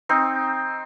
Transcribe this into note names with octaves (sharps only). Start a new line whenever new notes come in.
C4 D#4